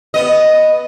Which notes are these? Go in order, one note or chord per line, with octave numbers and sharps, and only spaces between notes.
B3 D#5